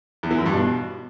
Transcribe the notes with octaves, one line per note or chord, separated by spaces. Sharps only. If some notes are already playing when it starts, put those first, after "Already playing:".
E2
E3
F#2
G2
B2